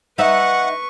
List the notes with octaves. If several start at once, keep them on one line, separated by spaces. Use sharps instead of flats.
D#4 B4 E5 F#5 C#6